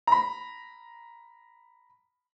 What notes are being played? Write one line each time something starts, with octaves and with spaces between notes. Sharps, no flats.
A#5 B5